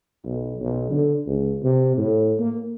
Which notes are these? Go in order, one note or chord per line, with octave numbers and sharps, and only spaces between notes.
B1
B1
D3
C#2
C3
A2
A#3